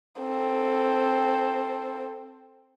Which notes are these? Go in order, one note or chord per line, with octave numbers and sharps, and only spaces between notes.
C4 A4